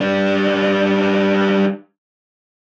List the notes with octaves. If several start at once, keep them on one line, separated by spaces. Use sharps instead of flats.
G3 D4